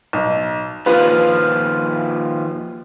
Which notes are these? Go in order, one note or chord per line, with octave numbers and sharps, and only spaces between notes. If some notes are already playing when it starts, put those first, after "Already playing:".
B1
D#2 F3 F4 B4